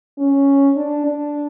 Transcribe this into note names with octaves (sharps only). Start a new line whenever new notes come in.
C#4
D4
D4